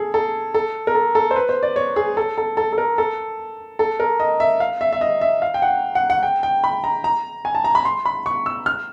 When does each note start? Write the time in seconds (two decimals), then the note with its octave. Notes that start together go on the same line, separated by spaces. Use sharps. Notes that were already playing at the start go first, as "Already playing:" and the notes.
Already playing: G#4 A4
0.14 A4
0.54 A4
0.87 A#4
0.95 A4
1.15 A4
1.31 C5
1.36 B4
1.49 C5
1.63 D5
1.76 C#5
1.96 G#4
2.17 A4
2.38 A4
2.57 A4
2.73 A4
2.78 A#4
2.98 A4
3.79 A4
4.00 A#4
4.20 D#5
4.40 E5
4.60 F5
4.81 E5
4.93 E5
5.01 D#5
5.21 E5
5.42 F5
5.54 G5
5.62 F#5
5.95 F#5
6.10 F#5
6.23 G5
6.43 G5
6.64 B5
6.84 A#5
7.04 A#5
7.45 G#5
7.55 A5
7.64 A#5
7.75 B5
7.85 C6
8.06 B5
8.26 C#6
8.46 E6
8.66 F6